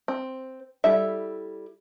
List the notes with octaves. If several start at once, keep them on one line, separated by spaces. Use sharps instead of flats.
C4
G3 E4 A4 E5